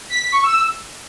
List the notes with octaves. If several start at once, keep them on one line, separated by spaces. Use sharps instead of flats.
B6
B6
C#6
E6